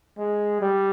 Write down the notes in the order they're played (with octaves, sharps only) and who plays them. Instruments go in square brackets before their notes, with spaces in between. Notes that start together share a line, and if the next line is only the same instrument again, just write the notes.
[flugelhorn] G#3
G3